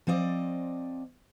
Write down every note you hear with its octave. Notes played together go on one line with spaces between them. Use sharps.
F3 C4 D5 D#5